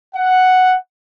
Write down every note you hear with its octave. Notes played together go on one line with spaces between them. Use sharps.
F#5